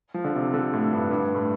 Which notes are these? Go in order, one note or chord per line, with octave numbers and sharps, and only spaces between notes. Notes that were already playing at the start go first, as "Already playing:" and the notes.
F3
D3
C3
D3
A2
G2
G2
A2